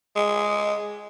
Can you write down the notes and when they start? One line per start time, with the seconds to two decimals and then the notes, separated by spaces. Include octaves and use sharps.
0.16 G#3